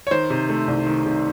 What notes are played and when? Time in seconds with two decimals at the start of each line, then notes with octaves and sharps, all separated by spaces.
0.07 C#5
0.11 D#3 C5
0.30 C3
0.49 A3
0.68 C2
0.87 D#3
1.05 C3